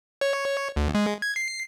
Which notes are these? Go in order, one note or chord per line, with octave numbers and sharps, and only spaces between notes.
C#5
D2
G#3
G#6
C7